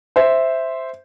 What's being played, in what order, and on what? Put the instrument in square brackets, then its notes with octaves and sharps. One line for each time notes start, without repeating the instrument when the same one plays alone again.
[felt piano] C5 E5